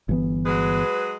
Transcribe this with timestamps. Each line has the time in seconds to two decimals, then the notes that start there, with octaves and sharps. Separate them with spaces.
0.09 G1 E3 B3
0.46 F#3 G#3 B4